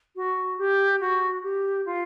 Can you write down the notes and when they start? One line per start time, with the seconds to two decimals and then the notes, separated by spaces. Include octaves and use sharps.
0.15 F#4
0.58 G4
1.00 F#4
1.42 G4
1.85 F4